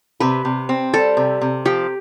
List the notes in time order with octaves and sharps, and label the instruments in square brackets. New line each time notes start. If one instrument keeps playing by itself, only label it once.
[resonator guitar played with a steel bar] C3 [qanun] B4
[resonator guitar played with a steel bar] C3
C4
[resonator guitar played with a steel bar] G3 [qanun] A4
[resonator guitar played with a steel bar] C3
C3
[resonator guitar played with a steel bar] F3 [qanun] G4